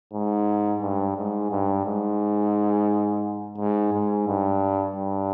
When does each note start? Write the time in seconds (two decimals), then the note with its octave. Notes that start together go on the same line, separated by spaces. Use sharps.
0.13 G#2
0.81 G2
1.17 G#2
1.51 G2
1.85 G#2
3.58 G#2
3.93 G#2
4.27 G2
4.96 G2